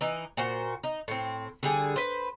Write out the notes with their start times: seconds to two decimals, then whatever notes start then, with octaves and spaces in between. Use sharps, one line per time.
0.01 E3 D#4
0.37 A#2 F#4 C5
0.84 D#4
1.08 A2 C4
1.63 D3 G3 G#4
1.96 B4 C5